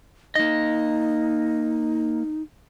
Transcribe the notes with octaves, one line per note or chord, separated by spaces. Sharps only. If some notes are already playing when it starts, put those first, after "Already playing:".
A#3 D#4 D#5